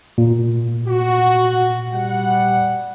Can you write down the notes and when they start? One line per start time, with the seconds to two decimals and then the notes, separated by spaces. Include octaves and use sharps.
0.18 A#2
0.88 F#4
1.93 G3 F#5